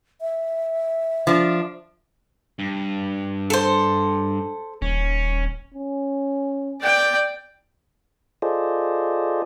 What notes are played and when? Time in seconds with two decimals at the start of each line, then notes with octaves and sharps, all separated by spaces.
0.21 E5
1.27 F3 D4
2.59 G2
3.50 A4 C5
4.82 D#1 C#4
5.75 C#4
6.80 D5 G5
8.42 F4 G#4 A4 C5 D5 D#5